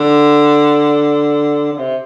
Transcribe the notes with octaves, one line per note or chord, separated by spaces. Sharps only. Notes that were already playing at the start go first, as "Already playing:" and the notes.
Already playing: D3
D3
C3